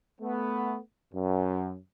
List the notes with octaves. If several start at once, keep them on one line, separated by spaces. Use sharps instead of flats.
A3 B3
F#2